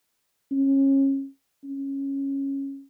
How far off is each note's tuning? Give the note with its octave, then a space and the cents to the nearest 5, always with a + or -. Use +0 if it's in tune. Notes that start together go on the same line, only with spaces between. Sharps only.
C#4 -25
C#4 -10